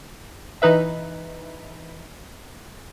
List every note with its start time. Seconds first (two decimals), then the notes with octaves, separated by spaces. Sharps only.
0.62 E3 D#4 B4 E5